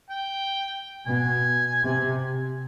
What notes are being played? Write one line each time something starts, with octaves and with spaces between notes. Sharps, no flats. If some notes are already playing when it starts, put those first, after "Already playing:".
G5
B2 G#5
C3